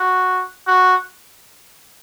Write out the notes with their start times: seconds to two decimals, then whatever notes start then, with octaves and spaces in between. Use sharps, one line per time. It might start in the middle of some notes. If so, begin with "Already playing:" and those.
Already playing: F#4
0.67 F#4